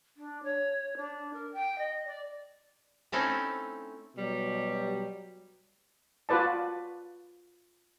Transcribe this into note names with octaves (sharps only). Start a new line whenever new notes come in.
D4
C#5
D4
A#4
G5
D#5
D5
A3 C4 C#4 D#4 E4 A4
B2 F#3 G3
F4 F#4 B4 D5 A5